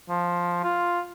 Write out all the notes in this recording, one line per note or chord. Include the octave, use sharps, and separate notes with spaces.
F3
F4